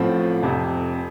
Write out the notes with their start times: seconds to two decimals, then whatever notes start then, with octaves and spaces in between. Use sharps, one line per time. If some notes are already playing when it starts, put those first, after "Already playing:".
Already playing: A1 A2 F3 A3 C4
0.42 F1 F2 C3